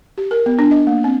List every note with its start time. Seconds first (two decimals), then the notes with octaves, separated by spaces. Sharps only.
0.18 G4
0.31 A#4
0.46 B3
0.59 D4
0.71 D#5
0.87 A#3
1.04 C4